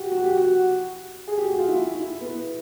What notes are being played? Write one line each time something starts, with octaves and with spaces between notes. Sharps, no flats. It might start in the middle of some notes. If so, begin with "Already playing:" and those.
Already playing: F#4 G4
F#4
G4
F#4
G#4
G4
F#4
F4
E4
E4
B3